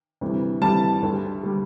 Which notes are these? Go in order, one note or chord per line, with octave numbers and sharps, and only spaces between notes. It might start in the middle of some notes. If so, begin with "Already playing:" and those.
D2 C3 E3 G3
D2 C3 E3 G3 A5
D2 D3 G3
D3 G3